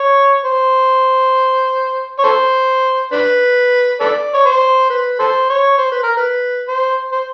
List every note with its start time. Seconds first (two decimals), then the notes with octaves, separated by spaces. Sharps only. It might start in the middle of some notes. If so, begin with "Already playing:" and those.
Already playing: C#5
0.45 C5
2.19 C#5
2.24 A4 C5
3.12 D4 B4
4.00 A4 B4 D5
4.34 C#5
4.45 C5
4.90 B4
5.19 A4 C5
5.49 C#5
5.78 C5
5.92 B4
6.03 A#4
6.17 B4
6.68 C5
7.12 C5